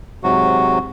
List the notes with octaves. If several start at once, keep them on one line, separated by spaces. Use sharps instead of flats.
G#2 C3 F#3 F#4